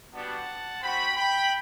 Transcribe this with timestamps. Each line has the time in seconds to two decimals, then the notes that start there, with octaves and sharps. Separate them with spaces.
0.13 G3 B3 D4 F#4 F#5 A5
0.82 C4 F#4 G5 B5
1.17 G5 B5